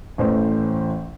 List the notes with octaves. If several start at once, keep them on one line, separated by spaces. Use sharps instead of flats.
A1 A2 E3 C5